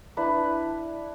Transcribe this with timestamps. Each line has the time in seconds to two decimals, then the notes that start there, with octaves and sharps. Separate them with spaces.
0.17 D4 E4 B4